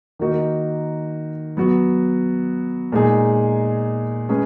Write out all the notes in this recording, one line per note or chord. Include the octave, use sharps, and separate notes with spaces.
D#3 A#3 D#4 F#4
F#3 B3 F#4
A#2 G#3 D#4 G#4
G#3 C#4 G#4 B4